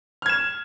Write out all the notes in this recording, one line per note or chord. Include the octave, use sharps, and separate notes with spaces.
F6 G#6 E7